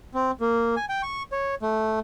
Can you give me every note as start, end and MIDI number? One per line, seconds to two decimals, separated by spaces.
0.14 0.31 60
0.41 0.75 58
0.76 0.85 80
0.89 1.02 79
1.03 1.23 85
1.32 1.55 73
1.62 1.99 57